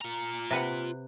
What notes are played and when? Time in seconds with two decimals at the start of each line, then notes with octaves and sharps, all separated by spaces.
0.01 F4 A#5
0.51 C3 B4 F#5